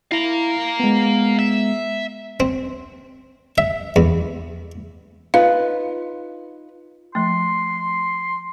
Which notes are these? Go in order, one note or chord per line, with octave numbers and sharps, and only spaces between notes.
E4 F5 A#5
G#3 B3
E5
C4
E5
E2
D#4 F4 B4 F5
F3 A3 C6